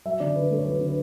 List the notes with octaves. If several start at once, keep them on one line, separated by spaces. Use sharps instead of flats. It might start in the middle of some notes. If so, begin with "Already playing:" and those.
F#3 E5
D3 D5
D3 B4
A3 A4
C#5
F#3 B4
D3
B4